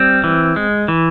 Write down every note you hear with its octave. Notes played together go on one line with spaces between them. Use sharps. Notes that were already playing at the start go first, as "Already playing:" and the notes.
Already playing: G3 C4
E3
G#3
E3